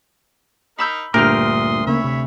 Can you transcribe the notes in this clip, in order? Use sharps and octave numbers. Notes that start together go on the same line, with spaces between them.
D#4 A#4 B5 E6 G6
D2 G2 A#2 G4 A#4 C6 D#6 F6
C#3 A#3 C#5 E5 B5
C3